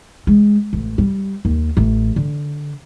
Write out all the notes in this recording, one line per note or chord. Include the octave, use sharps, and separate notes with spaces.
G#3
A1
G3
D#2
A1
D3